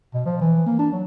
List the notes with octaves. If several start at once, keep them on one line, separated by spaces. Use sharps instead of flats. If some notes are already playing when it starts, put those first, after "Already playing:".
B2
F3
E3
A#3
D4
F#3